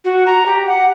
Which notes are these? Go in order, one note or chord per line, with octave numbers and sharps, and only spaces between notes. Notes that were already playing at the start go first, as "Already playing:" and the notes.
F#4
A#5
G4
F#5